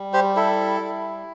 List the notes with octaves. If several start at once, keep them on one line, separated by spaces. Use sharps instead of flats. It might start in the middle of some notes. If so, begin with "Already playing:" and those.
Already playing: G3
G4 C5
E4 A4
G3